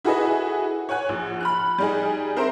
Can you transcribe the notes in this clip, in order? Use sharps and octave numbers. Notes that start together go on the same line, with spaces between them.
E4 F#4 G#4 A4 B4 D#5
C#5 F#5 G#5 F#6
A#1
B5 F6 F#6
G3 D#4 G#4
C4 A#4 C5 E5 A#5 C6